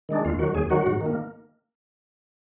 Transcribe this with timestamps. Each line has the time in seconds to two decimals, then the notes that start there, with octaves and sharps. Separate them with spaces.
0.09 D#3 G#3 D4
0.25 D#2 F4
0.39 D#3 F#3 F#4
0.55 D#2 G#4
0.70 D#3 F#3 F#4
0.86 G#2
1.01 D#3
1.06 A#3